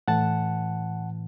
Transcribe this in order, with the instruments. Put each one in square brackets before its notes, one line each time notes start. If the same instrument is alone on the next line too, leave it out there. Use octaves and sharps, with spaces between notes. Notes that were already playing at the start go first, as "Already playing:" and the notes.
[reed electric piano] A2 E3 F#5 A5